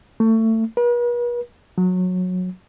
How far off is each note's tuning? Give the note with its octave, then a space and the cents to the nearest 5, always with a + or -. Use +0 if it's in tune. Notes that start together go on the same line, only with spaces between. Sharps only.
A3 +25
B4 -45
F#3 -20